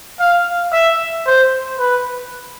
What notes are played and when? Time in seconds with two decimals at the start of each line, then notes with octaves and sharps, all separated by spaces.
0.20 F5
0.72 E5
1.27 C5
1.79 B4